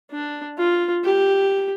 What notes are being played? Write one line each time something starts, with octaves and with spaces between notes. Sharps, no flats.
D4
F4
G4